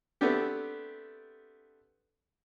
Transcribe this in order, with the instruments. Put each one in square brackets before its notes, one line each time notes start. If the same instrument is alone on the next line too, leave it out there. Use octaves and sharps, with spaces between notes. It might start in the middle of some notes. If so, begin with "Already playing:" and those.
[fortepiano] A3 B3 C4 D4 G4